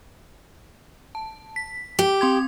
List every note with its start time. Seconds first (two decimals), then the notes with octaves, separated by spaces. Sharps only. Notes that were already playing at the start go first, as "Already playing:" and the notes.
1.15 A5
1.56 B6
1.99 G4
2.21 C4 C6 G#6